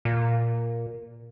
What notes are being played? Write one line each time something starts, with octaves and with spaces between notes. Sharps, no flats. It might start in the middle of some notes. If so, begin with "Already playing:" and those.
A#2